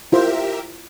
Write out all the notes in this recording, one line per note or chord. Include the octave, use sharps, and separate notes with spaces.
E4 F4 G4 A#4 C5 E5